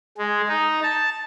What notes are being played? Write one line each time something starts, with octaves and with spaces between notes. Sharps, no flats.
G#3
D#4
A5